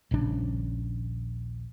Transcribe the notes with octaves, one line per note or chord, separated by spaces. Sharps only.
D#1 A#1 C#3 D4